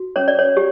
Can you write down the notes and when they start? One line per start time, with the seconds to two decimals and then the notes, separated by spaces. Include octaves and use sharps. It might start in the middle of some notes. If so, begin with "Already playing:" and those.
Already playing: F#4
0.16 C#4 C#5
0.28 D5
0.39 C#5
0.57 G4